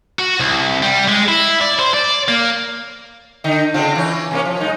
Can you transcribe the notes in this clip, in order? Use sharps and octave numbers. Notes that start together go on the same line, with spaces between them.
F#4
C2
G3
G#3
E4
D5
C5
D5
A#3
D3 D#4
C#3 C4 F4
E3 C#4
C3 A#3 C#4
F3
G#3 D#4